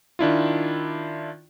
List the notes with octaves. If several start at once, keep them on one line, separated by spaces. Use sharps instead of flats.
D#3 D4 E4 F4